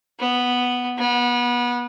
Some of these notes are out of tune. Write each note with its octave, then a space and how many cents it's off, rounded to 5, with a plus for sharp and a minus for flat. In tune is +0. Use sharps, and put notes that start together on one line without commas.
B3 +0
B3 -25